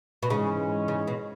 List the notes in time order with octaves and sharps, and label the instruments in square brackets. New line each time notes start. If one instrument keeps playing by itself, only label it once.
[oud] B2
[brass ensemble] G#2 E3 G#3 C#4 [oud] C#3
[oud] C#3
B2